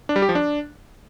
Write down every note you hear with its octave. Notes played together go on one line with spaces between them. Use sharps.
D4
G3
G4
F3
D4